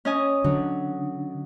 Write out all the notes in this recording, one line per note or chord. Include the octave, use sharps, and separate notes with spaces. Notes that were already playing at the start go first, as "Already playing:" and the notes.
C#4 D#5 G#5
D3 F#3